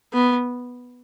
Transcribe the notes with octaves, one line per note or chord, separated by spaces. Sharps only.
B3